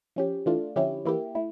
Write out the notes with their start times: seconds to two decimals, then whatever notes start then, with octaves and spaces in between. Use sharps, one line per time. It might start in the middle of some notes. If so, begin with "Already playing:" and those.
0.16 F3 C#4 G4
0.46 E3 A3 D4 F4
0.76 D3 F3 C#4 E4 G4
1.05 E3 A#3 E4 G4
1.35 A3 E4